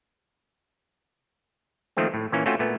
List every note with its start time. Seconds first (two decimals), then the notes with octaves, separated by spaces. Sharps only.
1.97 D#3 F3 A3 A#3 C4
2.14 A2
2.32 A#2 E3 A#3 C#4
2.46 A3 C4 C#4 F4 F#4 C5
2.59 A#2 A3 B3